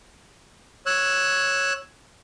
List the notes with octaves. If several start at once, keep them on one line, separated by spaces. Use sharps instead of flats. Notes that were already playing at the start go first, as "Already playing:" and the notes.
C#5 E6 F#6